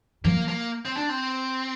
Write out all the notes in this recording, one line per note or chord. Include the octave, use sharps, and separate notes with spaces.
F3 A#3
A#3
C4
D4
C4